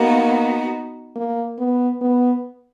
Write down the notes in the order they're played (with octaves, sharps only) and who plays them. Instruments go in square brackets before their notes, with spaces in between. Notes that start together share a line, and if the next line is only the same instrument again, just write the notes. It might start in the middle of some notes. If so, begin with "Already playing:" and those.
Already playing: [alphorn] A#3 [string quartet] B3 D#4 F#4
[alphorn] A#3
B3
B3